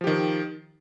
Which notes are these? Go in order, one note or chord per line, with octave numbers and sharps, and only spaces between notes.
D#3 F3 G4